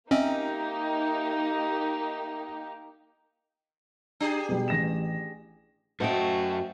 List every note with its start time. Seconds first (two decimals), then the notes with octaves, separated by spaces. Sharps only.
0.11 A#3 C4 C#4 D#4 G4 D#5 E5
4.20 D4 G4 G#4
4.49 B2 G3
4.68 A1 A#6 E7
6.00 F#2 A3 F#4 C5 D#5 F#5 G5